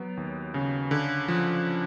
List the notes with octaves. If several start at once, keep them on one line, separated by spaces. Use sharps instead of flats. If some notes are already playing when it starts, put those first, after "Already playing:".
Already playing: F#3 B3
D#2
C#3
D3
F3